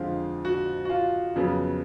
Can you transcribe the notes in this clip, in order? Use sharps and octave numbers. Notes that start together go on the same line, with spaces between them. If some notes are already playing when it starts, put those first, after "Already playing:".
Already playing: F2 D3 F3 G#3 C4 F4
F#4
F#4
F4
F2 C#3 F#3 B3